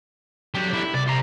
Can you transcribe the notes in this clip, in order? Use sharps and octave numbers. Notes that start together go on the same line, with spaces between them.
D3 F#3 G4
E4
C2 D5
C5 A#5